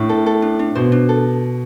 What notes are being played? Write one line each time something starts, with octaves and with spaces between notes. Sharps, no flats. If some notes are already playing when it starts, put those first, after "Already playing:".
Already playing: A2 D4
A4
A4
D4
D4
B2 C5
D4
A4